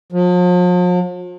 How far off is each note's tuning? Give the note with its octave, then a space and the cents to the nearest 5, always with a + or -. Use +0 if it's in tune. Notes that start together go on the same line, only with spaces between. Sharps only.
F3 +45